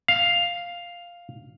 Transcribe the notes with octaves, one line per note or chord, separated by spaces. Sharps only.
F5